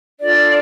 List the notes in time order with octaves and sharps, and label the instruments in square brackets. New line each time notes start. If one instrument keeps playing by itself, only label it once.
[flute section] D4 F4 A4 D5